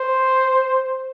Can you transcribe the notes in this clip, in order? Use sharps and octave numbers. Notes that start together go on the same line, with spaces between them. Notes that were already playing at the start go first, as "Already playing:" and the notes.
Already playing: C5